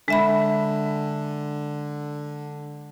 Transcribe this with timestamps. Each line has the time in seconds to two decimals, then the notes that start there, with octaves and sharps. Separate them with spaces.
0.08 D3 G#3 E5 B5